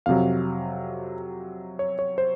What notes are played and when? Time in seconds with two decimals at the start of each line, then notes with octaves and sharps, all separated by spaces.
0.06 F2 C3 F#3 F5
1.79 C#5
1.99 C#5
2.18 C5